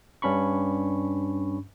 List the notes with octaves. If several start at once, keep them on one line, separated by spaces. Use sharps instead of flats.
G2 C#4 D4 B5 C#6